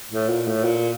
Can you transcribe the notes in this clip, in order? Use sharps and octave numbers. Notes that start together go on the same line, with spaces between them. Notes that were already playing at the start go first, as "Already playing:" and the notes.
A2
A#2
A2
A#2